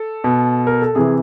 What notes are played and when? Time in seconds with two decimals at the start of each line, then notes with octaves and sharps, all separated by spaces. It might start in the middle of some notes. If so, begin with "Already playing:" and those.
Already playing: A4
0.24 B2
0.67 A#4
0.82 A4
0.95 C3 E3 G#4